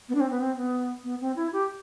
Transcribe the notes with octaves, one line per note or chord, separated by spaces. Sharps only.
B3
D4
C4
B3
C4
B3
B3
C4
E4
G4